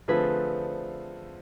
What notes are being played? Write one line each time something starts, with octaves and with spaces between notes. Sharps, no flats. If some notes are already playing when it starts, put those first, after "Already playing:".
D3 F3 A3 C4 F4 G#4 B4